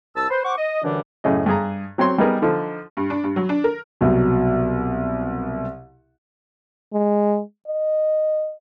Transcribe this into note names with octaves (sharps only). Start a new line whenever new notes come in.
C2 A5 E6
B4 C5
C5 F#5 C#6 D6
D#5
F#2 D3 E3 G3 D4
F#2 A2 C#3 D#5
G2 G#4 A#5
F#3 C4 C#5 C6
G3 B3 D#4 G#4 A#4 B4
D3 F3 D#4
G2
D4
G2
F#3
D4
A#4
C2 B2 F#3
G#3
D#5